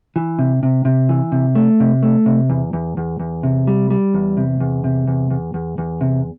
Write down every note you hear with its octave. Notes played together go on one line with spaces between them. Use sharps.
E3
C3
C3
C3
E3
C3
A3
C3
A3
C3
E2
E2
E2
E2
C3
G3
G3
E2
C3
E2
C3
E2
E2
E2
E2
C3